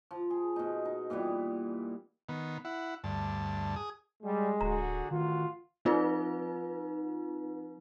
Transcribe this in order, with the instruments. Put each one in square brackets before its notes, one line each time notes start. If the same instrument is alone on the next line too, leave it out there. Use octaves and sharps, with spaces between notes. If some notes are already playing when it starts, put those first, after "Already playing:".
[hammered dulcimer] F3
G#4
B2 D#4
D#4
A#2 E3 G3 B3
[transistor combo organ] D#3 B3
E4 F#5
D2 G2 A5
G#4 D#6
[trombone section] G3 [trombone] G#3
[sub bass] D1 [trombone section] D3 F#4 G#4 [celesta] A#5
[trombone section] A1 F#4 [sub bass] D#3 [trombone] F4
[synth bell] F3 C4 D#4 F4 B4